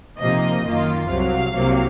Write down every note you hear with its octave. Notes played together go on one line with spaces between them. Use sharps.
C3 F3 A#3 D#4 D#5
F#2 D#3 A#3 F4
C2 C3 F#3 F5
C2 C3 F#3 A#3